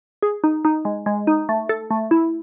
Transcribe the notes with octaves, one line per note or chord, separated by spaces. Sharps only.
G#4
D#4
D#4
G#3
G#3
D#4
A3
A4
A3
E4